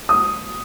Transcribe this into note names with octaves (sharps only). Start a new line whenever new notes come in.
D#6